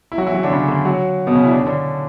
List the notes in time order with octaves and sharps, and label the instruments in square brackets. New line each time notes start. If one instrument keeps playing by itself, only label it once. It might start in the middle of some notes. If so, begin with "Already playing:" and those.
[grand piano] E4
F#3 F#4
E3 E4
F#3 F#4
D3 D4
C#3 C#4
D3 D4
F#3 F#4
B2 B3
C#3 C#4
E4
D4
C#4
D3 D4